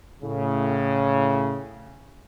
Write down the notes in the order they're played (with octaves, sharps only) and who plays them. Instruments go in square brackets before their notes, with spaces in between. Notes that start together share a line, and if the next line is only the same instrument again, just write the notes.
[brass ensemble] A2 C#3